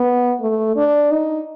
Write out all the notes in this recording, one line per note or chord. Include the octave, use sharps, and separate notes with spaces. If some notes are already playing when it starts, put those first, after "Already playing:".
Already playing: B3
A3
D4
D#4